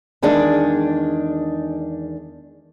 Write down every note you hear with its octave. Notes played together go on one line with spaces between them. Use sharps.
E2 D#3 G#3 D4 G#4